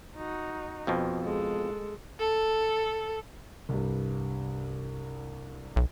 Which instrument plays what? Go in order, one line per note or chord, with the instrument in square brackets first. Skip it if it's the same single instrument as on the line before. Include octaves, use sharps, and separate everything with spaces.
[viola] D#4 F#4
[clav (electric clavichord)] F2 B2 F3
[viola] G#3 A4
[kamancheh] A4
[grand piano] C2 G2
[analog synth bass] B1